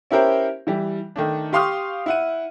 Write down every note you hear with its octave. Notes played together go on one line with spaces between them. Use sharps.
C#4 E4 G4 A#4 C5
E3 G3
D#3 A3 D4
G4 F5 C6 C#6 D#6 F6
E4 F#5 D#7